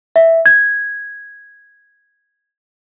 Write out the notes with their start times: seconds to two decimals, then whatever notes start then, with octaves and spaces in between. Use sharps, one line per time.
0.16 E5
0.46 G#6